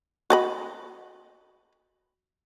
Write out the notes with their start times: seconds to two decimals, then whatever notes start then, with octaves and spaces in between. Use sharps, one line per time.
0.30 F#4 D#5 B5